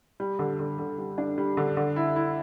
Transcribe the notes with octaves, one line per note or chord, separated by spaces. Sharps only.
G3
D3
D3
D3
G3
D4
G3
D3
D3
E4
E4